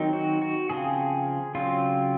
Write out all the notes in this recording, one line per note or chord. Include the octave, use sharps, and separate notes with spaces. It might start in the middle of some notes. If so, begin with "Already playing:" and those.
Already playing: D#3 F#3 C4 D#4
F#4
F#4
C#3 F3 C4 G#4
C#3 F#3 C4 F4